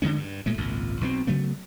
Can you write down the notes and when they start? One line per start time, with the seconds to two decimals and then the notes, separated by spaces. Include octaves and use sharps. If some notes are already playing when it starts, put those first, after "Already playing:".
0.02 D3 E3 G#3 C#4
0.17 G2
0.46 A#2 G#3 A3
0.57 G#1 C#2 A#2
1.01 B1 B2 F#3 C4
1.27 C#3 F#3 A3 B3